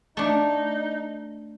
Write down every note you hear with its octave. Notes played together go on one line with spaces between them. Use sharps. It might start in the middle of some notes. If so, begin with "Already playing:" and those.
A3 D4 D#4